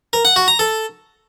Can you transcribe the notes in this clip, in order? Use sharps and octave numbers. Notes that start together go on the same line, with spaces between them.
A#4
F#5
F#4
A#5
A4